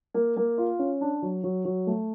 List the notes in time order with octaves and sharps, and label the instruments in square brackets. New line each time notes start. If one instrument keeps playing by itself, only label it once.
[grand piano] A#3
A#3
F4
C#4
D4
F#3
F#3
F#3
A3